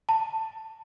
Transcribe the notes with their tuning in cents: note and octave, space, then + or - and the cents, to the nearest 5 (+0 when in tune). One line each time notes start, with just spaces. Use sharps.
A5 +10